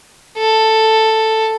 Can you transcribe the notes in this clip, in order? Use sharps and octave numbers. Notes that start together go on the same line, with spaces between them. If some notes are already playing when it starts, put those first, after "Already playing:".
A4